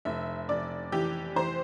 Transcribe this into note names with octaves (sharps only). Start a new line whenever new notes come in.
F1 E5
F1 D5
E3 G4
E3 C5